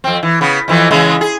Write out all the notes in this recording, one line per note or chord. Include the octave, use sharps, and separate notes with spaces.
F2 C4
E3
C#3 B3
F2 E3 F3
C#3 E3 G#3
G#4